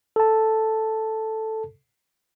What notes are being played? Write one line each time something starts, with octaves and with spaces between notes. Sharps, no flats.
A4 A5